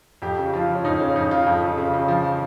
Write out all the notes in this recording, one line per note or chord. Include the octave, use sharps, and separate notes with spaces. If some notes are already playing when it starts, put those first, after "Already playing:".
F2 G4
C#3
F3 F4
F3
C#4
F2 D#4
C#3 C#4
F2 D#4
C#3 F4
F2
F2
C#3
C#3
F3